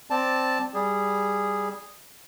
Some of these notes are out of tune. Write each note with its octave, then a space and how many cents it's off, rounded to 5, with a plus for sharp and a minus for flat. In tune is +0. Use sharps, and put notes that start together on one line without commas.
C4 +0 D5 +0 A5 +0
G3 +0 G#4 -10